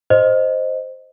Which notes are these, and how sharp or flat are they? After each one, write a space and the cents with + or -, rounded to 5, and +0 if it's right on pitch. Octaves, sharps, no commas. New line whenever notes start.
C5 +0 D#5 -5